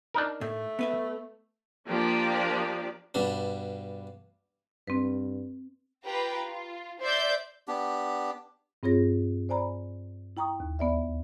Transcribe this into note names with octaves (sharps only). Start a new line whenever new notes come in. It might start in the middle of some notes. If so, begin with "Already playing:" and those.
D4 D#4 A#4
A2 A3
B3 B4 E5
F3 A#3 D4 G4 D5
G2 B2 D4
G2 C4 B4
F4 G4 B4 G5 A#5
F4
C5 D5 E5 G6
B3 D4 G4
G2 C4 F4 G#4 C#5 A#6
C5 D5 G#5 A#5 B5
E4 G5 A#5 C#6 D#6
D#2
D2 B3 D5 E5